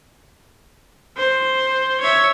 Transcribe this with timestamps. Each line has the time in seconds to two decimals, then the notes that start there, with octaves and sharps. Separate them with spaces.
1.17 C5
2.01 C#5 E5